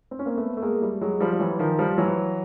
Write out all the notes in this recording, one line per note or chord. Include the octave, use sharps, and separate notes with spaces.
C4
C#4
A#3 C4
A3 B3
A3
G#3 A#3
G3 A3
F#3 G#3
F3 G3
F3
E3 F#3
D#3 F3
F3 G3
E3 F#3